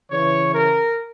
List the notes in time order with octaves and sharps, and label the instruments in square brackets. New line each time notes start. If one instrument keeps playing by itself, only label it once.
[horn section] C#3 E3 C#5
A#4